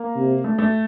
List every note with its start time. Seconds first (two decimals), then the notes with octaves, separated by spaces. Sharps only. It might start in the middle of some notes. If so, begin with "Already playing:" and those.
Already playing: A#3
0.16 C3
0.44 A3
0.58 A3